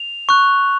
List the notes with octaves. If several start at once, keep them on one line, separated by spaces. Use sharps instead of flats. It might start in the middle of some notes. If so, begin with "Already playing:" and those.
Already playing: F7
C#6 F#6